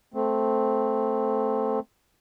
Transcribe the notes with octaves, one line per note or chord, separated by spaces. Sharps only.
A3 C4